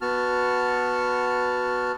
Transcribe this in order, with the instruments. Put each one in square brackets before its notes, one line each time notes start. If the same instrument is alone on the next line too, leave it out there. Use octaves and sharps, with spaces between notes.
[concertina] B3 F#4 A5 F6